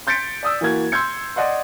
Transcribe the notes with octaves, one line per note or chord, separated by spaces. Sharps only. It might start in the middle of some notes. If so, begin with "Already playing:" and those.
C6 G6 A6 B6 C#7 D7
D5 D#6 E6
E3 A#3 F#4 G#6
C6 E6 G6 G#6 C#7
D5 D#5 F#5 C6